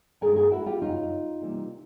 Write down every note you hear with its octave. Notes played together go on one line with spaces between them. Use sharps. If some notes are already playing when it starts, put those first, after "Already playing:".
G2 D#3 G#3 G#4 A#4
G#4 A#4
E4 F#4
F4 G4
F#2 C#3 F#3 D#4 F4
C3 E3 G3 A#3